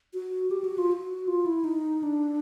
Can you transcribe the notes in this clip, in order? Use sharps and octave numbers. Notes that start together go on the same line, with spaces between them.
F#4
G4
F#4
F4
F#4
F4
E4
D#4
D4